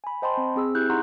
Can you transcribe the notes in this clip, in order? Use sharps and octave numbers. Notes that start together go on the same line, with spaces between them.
G#5 B5
C5 D#5 G5 A5 B5 C6
C4
C4 G#4 E6
E4 G4 G#4 F#6 G6
D#4 E4 F#5 A#5 C6 C#6